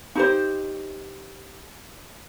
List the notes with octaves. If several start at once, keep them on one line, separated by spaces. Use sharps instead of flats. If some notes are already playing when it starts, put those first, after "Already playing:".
D#4 G4 C5